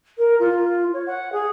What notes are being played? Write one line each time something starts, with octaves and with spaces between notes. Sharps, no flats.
A#4
F4
C#5
F#5
G#4